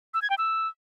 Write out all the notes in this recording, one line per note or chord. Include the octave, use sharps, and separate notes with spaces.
E6
G#6
G5
E6